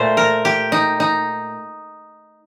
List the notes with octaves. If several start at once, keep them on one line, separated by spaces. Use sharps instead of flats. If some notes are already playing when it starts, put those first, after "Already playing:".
Already playing: A#2 A3 C5
A#4
G4
D#4
D#4